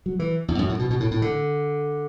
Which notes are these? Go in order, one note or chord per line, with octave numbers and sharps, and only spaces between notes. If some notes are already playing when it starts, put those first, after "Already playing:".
F#3
E3
E2
F#2
A2
B2
B2
A2
A2
D3